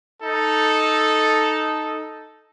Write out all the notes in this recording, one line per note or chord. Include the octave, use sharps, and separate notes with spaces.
D#4 A4